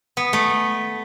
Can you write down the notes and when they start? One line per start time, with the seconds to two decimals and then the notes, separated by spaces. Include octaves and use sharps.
0.17 B3
0.33 A3